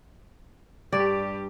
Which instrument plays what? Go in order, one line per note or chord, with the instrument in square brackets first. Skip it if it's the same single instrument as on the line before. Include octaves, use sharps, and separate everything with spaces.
[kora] G2 D5 [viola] G3 G4